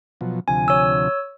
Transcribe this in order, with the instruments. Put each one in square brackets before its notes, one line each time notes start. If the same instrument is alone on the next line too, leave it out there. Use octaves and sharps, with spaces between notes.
[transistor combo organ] B2 F3 F#3
[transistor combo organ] D2 C3 F3 [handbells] G#5
[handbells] C#5 E6